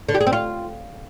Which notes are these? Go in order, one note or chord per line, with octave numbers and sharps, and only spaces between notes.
D3
G4
G#4
C4
F4